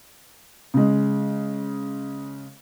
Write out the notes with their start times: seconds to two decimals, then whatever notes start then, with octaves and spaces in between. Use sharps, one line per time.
0.74 C#3 G#3